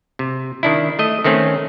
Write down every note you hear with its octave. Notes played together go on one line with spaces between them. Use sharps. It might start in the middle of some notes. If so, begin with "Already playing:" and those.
C3
D#3 D4 E4
A3 D#5
D#3 A3 C4 C#4